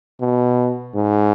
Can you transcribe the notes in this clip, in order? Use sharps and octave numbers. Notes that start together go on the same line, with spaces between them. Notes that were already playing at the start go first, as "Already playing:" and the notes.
B2
G#2